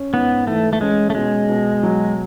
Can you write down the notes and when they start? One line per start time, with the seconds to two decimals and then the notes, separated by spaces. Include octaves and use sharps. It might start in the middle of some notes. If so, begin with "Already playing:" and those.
Already playing: C#4
0.14 G#2 B3
0.47 E3 A3
0.73 A3
0.81 G#3 C#4
1.10 A3
1.15 B2 G#3
1.49 B2
1.83 F#3